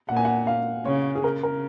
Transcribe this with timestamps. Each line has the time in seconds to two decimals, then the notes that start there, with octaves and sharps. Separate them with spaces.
0.09 A#2 F#5
0.16 G#5
0.25 F#5
0.47 F5
0.86 C#3 C#5
1.15 G#4
1.24 C#3 A#4
1.43 A#4